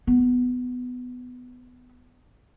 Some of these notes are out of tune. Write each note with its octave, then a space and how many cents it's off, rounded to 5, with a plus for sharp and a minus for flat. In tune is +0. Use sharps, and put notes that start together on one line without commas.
B3 +15